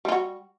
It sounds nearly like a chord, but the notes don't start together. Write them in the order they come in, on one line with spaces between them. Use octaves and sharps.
G3 F4 F#4